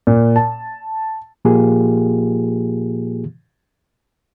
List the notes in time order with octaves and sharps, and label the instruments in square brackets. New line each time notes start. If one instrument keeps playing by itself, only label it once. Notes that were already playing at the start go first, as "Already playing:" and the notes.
[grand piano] A#2
A5
[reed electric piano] A#2 F3 A#3 F4 G4 G#4